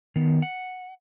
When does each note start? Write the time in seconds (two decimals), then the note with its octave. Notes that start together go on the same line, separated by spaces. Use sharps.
0.16 D#3 B3
0.42 F#5